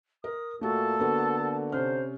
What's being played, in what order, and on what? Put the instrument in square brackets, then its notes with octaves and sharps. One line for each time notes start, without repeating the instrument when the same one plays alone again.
[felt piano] A#4 [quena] D#6
[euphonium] A#2 [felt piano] A3 F#4 [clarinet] A4 [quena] A5
[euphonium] D3 [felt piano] A#3 B3 F#4
[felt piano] C3 C#4 F6 [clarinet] C5